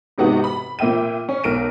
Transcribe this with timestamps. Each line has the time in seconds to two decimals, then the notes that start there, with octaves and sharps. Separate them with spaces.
0.18 G#2 C3 B3 D#4 F#4
0.44 B5
0.79 A#2 A#3 E5 G5 D#7
1.29 C#4
1.44 B1 A#4 D7 D#7